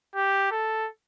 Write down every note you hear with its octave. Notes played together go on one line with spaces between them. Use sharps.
G4
A4